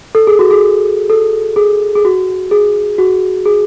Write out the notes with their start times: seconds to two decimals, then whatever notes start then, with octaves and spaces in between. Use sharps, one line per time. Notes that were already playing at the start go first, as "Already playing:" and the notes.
0.15 A4
0.27 G#4
0.39 F#4
0.51 G#4
1.10 A4
1.56 G#4
1.96 G#4
2.05 F#4
2.51 G#4
2.98 F#4
3.46 G#4